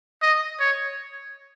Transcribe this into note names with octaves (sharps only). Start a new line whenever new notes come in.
D#5
C#5